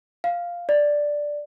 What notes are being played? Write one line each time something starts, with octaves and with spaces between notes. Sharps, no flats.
F5
D5